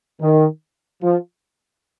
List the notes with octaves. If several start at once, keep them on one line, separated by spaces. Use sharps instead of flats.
D#3
F3